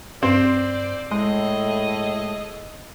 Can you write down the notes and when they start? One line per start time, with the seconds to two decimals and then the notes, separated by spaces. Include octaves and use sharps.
0.23 G2 C4 C5 D5
1.11 A2 G#3 G#4 A4 D#5